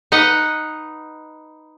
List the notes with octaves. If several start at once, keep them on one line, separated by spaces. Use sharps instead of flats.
D#4 B4 D#5 F#5